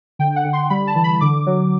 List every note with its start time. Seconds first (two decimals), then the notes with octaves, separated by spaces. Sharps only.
0.19 D3 G5
0.36 F#5
0.45 D3
0.53 C6
0.70 G3 B5
0.87 A5
0.95 E3
1.04 B5
1.21 D3 D6
1.46 F#3